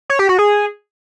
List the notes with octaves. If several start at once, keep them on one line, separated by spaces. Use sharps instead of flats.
C#5
G4
F#4
G#4